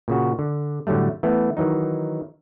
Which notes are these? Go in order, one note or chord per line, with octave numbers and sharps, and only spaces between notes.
A#2 C#3 F#4
D3
A2 D3 F#3 G3 A3
E3 A3 B3
D#3 E3 F#3 D#4